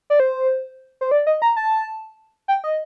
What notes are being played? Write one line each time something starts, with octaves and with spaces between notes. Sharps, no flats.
D5
C5
C5
D5
D#5
A#5
A5
G5
D#5